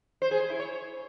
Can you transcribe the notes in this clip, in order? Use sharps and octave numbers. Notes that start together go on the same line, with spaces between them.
C5
G#4
C5
E4
C#5